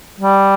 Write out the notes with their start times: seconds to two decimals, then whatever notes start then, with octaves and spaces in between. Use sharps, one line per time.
0.20 G3